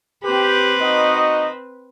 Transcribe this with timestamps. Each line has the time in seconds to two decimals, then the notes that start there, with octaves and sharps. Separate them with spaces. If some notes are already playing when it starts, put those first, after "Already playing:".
0.24 C4 G4 B4
0.81 D#4 F#4 D#5